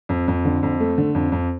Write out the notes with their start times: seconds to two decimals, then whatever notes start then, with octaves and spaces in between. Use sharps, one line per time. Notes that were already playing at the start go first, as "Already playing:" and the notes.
0.09 F2
0.28 F2
0.45 D3
0.63 F2
0.80 A3
0.98 D3
1.15 F2
1.32 F2